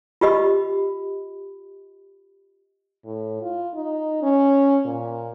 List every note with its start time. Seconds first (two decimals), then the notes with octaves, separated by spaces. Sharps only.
0.21 F4 G4 D#5 B5
3.05 A2
3.42 F4
3.74 D#4
4.22 C#4
4.85 A#2